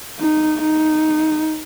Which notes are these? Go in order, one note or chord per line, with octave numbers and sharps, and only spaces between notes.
D#4
D#4